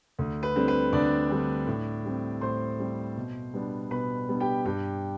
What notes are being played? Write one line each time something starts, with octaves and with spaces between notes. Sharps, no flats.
D2
B4
D3 G3 C4
B4
D2 D4 D5
D3 G3 C4
A2
G3 C4
A2 C5 C6
G3 C4
B2
G3 B3 D4
B2 B4 B5
G3 B3 D4
G4 G5
G2 G4 G5